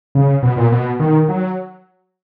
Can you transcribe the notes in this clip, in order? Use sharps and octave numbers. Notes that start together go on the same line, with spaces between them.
C#3
B2
A#2
B2
D#3
F#3